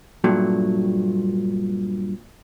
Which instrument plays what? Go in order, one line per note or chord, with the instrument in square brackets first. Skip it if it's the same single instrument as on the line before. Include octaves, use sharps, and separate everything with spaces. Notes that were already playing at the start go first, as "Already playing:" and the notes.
[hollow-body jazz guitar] G2 A#2 F#3 A3